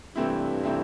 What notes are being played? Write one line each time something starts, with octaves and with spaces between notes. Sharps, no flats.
G2 C3 E3 A3 C4 E4
C3 E3 A3 C4 E4